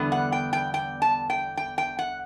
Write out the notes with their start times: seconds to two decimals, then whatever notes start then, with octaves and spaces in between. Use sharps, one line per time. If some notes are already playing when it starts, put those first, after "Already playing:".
Already playing: E2 D3 G3 B3
0.12 F#5
0.32 G5
0.53 G5
0.74 G5
1.02 A5
1.30 G5
1.57 G5
1.78 G5
1.99 F#5